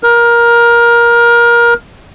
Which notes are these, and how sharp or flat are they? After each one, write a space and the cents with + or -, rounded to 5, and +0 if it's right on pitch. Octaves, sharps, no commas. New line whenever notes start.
A#4 +20